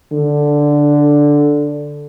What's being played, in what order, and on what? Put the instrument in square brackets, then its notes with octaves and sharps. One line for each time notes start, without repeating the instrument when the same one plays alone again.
[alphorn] D3